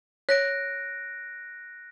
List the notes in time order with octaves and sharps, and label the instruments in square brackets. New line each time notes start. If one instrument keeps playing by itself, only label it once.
[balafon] C#5 [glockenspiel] F#6 A#6 D7